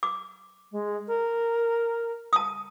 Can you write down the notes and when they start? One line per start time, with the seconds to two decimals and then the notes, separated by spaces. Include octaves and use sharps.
0.03 D6
0.72 G#3
1.08 A#4
2.33 A5 D#6